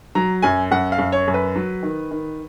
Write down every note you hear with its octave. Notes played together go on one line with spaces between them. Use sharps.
F#3 A#5
F#2 G#5
F#2 F#5
F5
F#2
C#5
F#2
B4
F#3
D#3
D#3